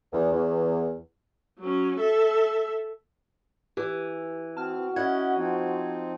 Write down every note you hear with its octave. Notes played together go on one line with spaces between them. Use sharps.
E2
E2
F#3 C#4
A4 E5
E3 G4
C4 F#4 A5 F6
C#4 E4 D#5 F#5 G#6
F3 C4 D#4